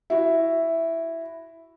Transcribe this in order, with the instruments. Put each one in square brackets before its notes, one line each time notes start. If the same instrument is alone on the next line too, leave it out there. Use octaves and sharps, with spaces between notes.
[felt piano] E4 F#4